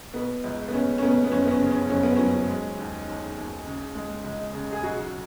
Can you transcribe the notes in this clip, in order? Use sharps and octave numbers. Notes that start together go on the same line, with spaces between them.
B2 B3
C#2
B3
C#2 C#4
C#4
B2 B3
B3
F#1 C#4
B3
C#4
C#3
C#4
F#1 C#4
B3
F#3 C#4
G#3
D#2
D#2
D#2
C#3
G#3
C#2
C#3
G#4
B1 F#4